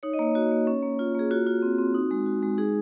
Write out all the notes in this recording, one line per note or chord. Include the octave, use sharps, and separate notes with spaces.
D#4 C#5
D#5
A#3 C#5
F#4
A#3
C#4
A#3
F4
A#3 G#4
F4 F#4
F4
C4
C4
D#4
G#3
F#4
G#3
D#4 G#4